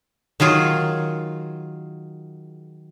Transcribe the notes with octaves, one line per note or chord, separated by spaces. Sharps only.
D#3 F#3 F4 G#4